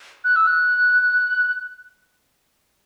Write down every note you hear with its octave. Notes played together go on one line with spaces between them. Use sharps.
F#6
E6
F#6